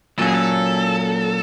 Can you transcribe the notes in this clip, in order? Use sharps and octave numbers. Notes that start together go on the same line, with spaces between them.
A#2 F#3 A#3 C#4 A4
G#4
A4